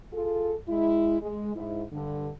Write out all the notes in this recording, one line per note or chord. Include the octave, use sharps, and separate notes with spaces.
F4 G#4 A4
G#3 E4
G#3
G#2 E4
G2 D3